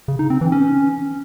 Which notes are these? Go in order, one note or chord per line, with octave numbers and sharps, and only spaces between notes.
C#3
D#4
C4
E3
C#4